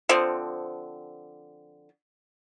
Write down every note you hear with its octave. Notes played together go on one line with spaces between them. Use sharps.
D3 F3 C4